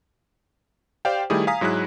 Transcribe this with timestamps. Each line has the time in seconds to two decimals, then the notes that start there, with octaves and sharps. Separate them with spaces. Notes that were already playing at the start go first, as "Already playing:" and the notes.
1.05 G4 C5 D5 F5 G5
1.30 D#3 G3 A3 E4 G4 G#4
1.47 F5 G#5 A#5 D#6 B6
1.61 G#2 F#3 E4 G#4 F#6